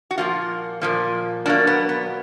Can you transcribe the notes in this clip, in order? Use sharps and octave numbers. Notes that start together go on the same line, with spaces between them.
F#4
A#2 F3 A#3 F4
A#2 F3 A#3
B2 F#3 A#3 D4
B3
B3